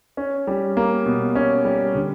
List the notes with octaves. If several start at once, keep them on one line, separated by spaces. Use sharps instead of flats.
C#4
G3
A#3
B2
C#4
G3
D3